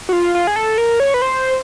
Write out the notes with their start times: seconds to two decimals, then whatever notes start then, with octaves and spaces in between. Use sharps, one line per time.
0.09 F#4
0.13 F4
0.35 F4
0.47 G#4
0.56 A4
0.78 A#4
1.00 C#5
1.14 B4
1.22 C5